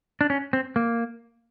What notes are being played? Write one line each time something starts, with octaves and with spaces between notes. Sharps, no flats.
D4
C#4
C4
A#3